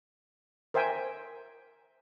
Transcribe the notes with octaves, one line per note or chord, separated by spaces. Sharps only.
A#4 C5 E5 G5 G#5